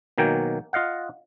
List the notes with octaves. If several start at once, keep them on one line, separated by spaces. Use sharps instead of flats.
B2 D#3 F#3 A#3 G5 G#5
F4 D#5 F5 F#5